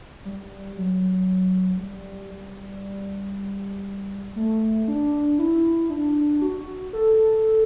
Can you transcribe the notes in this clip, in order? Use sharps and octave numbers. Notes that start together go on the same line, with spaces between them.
G3
F#3
G3
G3
A3
D4
E4
D4
F#4
A4